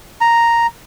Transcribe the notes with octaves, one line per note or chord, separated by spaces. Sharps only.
A#5